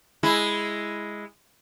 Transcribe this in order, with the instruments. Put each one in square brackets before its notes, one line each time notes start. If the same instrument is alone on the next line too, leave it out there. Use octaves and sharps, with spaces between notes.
[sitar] G#3 E4